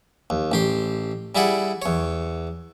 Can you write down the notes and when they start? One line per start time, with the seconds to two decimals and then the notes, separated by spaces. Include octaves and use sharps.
0.30 D#2
0.52 A1 G4 C6
1.35 G3 E4 G#4 D5 F#5
1.82 E2 C#5